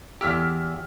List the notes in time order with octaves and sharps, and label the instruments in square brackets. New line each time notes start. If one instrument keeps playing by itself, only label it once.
[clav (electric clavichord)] E2 G4 [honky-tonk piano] E6 F6 B6